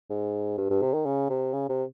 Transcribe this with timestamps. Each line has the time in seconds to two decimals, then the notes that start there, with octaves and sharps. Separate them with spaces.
0.10 G#2
0.58 G2
0.70 G2
0.82 C3
0.94 D#3
1.06 C#3
1.29 C3
1.53 C#3
1.69 C3